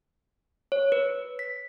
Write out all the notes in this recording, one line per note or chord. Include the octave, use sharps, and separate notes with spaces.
C#5
B4
B6